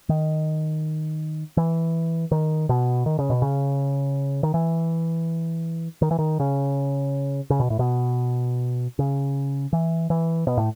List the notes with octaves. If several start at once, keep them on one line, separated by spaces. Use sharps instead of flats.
D#3
E3
D#3
B2
D#3
C#3
B2
C#3
D#3
E3
D#3
E3
D#3
C#3
C#3
B2
A2
B2
C#3
E3
E3
B2
A2